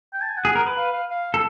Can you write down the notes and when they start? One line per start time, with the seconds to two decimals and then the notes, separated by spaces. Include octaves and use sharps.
0.13 G5
0.21 A5
0.29 G#5
0.37 F#5
0.45 G#4
0.55 A#4
0.66 B4
0.77 F5
0.93 F5
1.10 F5
1.34 A4